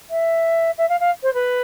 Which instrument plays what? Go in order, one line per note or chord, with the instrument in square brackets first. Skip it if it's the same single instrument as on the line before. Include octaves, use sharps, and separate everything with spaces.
[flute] E5
E5
F5
F5
C5
B4